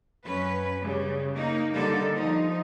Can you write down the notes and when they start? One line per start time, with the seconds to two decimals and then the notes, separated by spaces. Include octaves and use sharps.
0.24 F#2 C#4 B4
0.81 C#3 G3
1.33 A#3 D#4
1.72 D3 G3 A#3 D#4 A4
2.14 F3 D#4